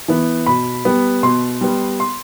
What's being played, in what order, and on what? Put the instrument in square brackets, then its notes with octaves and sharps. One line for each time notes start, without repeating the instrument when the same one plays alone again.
[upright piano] E3 B3
B2 B5
G3 B3
B2 C6
G3 B3
C6